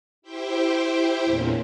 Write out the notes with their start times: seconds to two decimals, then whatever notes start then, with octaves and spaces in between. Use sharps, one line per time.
0.22 E4 G4 C5 E5 G5
1.24 E2 A#2 D3 A#3 C4 C#4